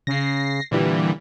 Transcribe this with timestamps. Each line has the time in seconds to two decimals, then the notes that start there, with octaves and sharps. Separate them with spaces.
0.07 C#3 A#6 C7
0.71 A#2 D3 E3 G3